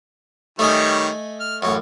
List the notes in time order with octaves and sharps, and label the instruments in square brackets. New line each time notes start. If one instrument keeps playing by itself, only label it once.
[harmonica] D#3 G3 C#5 [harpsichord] A3 D#5 G#5
[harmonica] F6
[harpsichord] A1 F#2 [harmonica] C#5